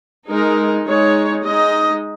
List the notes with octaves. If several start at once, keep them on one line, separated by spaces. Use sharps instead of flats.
G#3 D#4 A#4
G#3 D#4 C#5
G#3 D#4 D#5